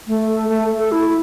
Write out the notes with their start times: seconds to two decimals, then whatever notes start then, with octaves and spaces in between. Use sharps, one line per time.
0.08 A3
0.49 A3
0.78 A4
0.92 E4